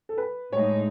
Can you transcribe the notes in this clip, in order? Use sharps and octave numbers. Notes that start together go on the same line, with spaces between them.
A4
B4
A2 G#3 D#4 C#5